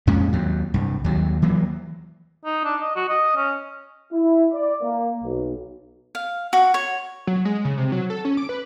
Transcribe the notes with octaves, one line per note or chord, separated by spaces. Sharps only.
F2 A#2 G#3 C#4
D#2 F#3
C2 G2
D#2 F#3
E3 F#3 A#3
D#4
D4
D#5
F#4
D#5
C#4
E4
D5
A#3
B1
F5
F#4
C#5
F#3
G#3
C#3
C3
F#3
A4
C#4
D6
B4